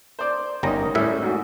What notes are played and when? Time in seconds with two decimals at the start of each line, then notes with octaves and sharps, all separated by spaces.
0.19 C5 D5
0.63 G1 G3 C#4 D#4 A#4 D#5 A#5
0.95 A2 G3 C#4 E5
1.22 G#2 F#4